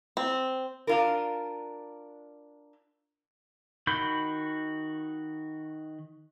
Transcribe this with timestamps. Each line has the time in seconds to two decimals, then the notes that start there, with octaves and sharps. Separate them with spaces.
0.17 C4
0.87 D4 F4 A#4
3.87 D#3 F#4 B5 G6